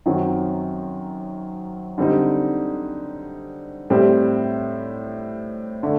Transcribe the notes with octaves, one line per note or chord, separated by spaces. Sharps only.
F#2 D#3 F#3 C4
D3 G3 C4 D#4
A2 G3 C4 G4
D3 A3